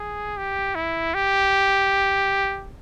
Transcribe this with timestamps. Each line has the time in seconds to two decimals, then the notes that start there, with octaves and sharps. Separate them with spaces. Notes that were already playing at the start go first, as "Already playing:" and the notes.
Already playing: G#4
0.37 G4
0.75 E4
1.14 G4